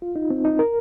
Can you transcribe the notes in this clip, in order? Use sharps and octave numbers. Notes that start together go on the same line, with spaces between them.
F4
D#4
C4
D#4
A#4